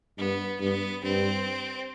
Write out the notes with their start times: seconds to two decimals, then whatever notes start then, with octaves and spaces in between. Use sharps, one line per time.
0.18 G2 B3
0.60 G2 B3
1.03 G2 C4